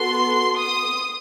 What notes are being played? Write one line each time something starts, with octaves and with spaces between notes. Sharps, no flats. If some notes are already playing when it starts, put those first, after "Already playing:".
Already playing: B3 F#4 A4 C6
D#6